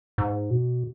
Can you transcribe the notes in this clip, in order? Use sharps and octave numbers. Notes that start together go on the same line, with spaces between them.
G#2
B2